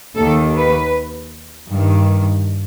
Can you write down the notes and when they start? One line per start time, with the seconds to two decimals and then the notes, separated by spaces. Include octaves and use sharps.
0.17 D#2 D#3 A4
0.55 B4
1.69 G2 D#3